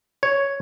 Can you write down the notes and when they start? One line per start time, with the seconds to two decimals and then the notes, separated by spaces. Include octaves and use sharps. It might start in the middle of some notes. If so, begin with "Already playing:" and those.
0.23 C#5